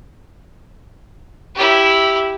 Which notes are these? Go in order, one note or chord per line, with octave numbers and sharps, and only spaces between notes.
E4 G4